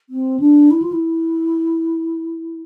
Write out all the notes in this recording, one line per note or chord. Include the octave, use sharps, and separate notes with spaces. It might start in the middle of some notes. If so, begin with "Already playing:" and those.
C4
D4
E4
F4
E4